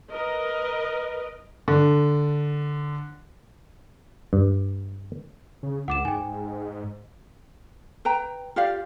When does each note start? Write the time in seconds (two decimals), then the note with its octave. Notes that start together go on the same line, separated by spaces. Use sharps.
0.10 A#4 B4 D#5
1.68 D3
4.33 G2
5.63 C#3
5.88 C#2 F#5 D6 E7
6.05 G#2 G5 G#5
8.05 B4 G5 A#5
8.56 F4 G4 D5 F5